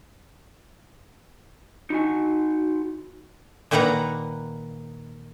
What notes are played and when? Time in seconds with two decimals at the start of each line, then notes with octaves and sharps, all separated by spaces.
1.90 D#4 F#4 G#5
3.71 A#2 D#3 A#3 B4 F#5 A#5